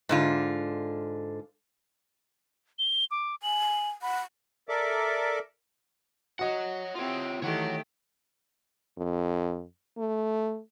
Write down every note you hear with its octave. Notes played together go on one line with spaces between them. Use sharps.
G#2 D3 F4
G7
D6
G#5 F#7
F#5 B5
A4 A#4 D5 E5 D6
F#4 C#5 D#5 F#5
C4 E4 F4 G4 C#5
D#3 E3 A3 G4 C#5 F#5
F2
A3